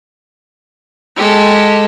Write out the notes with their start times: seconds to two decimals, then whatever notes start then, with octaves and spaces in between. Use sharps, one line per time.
1.16 G#3 G4 A4